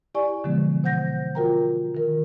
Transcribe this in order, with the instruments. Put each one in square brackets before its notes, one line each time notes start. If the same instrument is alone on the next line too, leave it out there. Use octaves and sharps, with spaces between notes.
[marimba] E4 G4 D5 G#5 C#6
B2 D3 E3 F3 G#3 B3
B2 C5 F#5 G6 A#6
F4 F#4 A#4 G5 A#5
D#3 A#4